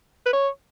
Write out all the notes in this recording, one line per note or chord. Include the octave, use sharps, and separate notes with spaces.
B4
C#5